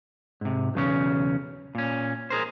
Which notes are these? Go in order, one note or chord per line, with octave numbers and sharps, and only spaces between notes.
G#2 C3
B1 E2 C#3 C#4
A#2 C#4
G#4 A#4 C5